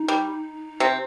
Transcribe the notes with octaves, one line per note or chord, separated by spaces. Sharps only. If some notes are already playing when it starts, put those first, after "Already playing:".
Already playing: D#4
G3
C3 C4